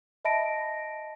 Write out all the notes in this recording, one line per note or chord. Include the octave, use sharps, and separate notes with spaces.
D#5 E5 A5 B5 A#6 D7